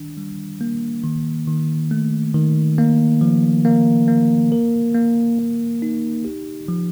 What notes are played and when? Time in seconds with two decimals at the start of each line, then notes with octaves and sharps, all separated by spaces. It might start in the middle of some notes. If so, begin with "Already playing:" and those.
Already playing: D#3 D4
0.17 G3
0.61 A#3
1.04 D#3
1.47 D#3
1.91 A3
2.34 D#3
2.78 A#3
3.21 F3
3.65 A#3
4.08 A#3
4.52 A#4
4.94 A#3
5.38 A#3
5.82 D#4
6.25 G4
6.68 F3